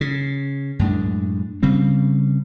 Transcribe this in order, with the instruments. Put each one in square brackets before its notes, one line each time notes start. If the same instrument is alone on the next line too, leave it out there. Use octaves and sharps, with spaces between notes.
[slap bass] C#3
F#2 A2 G#3 D4
C#3 G3 C4